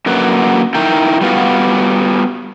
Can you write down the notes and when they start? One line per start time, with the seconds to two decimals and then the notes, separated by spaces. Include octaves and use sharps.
0.06 F#2 D3 A#3 F#4 B4
0.75 D#4 E4 A#4 G5
1.21 G3 B3 F4 F#4